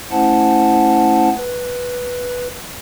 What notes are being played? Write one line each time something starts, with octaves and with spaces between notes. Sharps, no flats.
A3 C#4 E4 C5 F#5 A5
B4